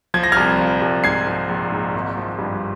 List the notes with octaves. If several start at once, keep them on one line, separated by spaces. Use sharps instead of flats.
F3 G#6
A#6
C2 F6 G#6
F3
C2
G#2 G#6 C7
F3
A#1
G#2
G#1
F3
G2